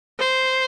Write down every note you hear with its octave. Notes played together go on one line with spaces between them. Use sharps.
C5